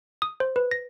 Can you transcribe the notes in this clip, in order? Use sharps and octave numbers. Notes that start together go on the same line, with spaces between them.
D#6
C5
B4
A#6